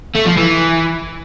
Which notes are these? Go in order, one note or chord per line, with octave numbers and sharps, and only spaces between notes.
A3
F3
E3